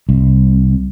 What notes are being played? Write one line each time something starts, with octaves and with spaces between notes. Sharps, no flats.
C2